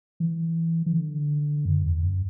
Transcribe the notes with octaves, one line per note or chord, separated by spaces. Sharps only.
E3
E3
D3
F#2
E2
F#2